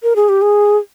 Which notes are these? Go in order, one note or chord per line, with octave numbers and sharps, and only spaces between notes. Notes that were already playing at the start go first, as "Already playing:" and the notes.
A#4
G#4
G4
G#4